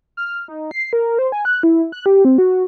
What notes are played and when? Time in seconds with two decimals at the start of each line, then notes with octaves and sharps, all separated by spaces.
0.17 F6
0.48 D#4
0.71 C7
0.93 A#4
1.19 C5
1.32 G#5
1.45 F#6
1.63 E4
1.92 F#6
2.06 G4
2.25 C4
2.38 F#4